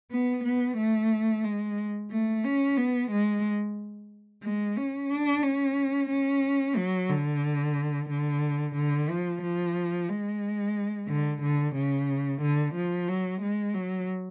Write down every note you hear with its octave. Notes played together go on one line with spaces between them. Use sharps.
B3
B3
A3
G#3
A3
C#4
B3
G#3
G#3
C#4
D4
C#4
C#4
F#3
D3
D3
D3
F3
F3
G#3
D3
D3
C#3
D3
F3
F#3
G#3
F#3